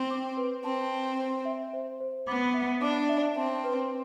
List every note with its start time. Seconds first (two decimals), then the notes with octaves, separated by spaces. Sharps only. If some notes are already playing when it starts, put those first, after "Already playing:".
Already playing: C4 G5
0.11 D6
0.37 B4
0.64 C4 A5
0.91 A5
1.18 C5
1.45 E5
1.73 C5
2.00 C5
2.27 B3 D6
2.54 E5
2.82 D4 D6
3.09 E5
3.36 C4 A5
3.64 B4